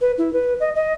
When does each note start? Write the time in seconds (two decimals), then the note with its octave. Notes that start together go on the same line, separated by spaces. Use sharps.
0.01 B4
0.18 E4
0.33 B4
0.60 D#5
0.76 D#5